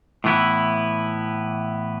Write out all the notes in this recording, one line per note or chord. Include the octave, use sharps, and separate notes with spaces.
A2 E3 B3 E4